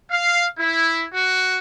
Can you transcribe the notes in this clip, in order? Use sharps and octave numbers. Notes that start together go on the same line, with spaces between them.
F5
E4
F#4